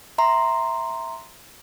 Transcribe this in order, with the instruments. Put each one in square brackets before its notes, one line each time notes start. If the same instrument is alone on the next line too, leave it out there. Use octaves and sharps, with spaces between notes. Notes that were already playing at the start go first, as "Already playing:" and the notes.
[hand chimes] E5 A#5 C6